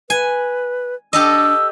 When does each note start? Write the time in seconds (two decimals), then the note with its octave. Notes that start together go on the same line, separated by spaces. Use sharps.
0.10 B4 G#5
1.13 D4 G4 A4 D#5 E6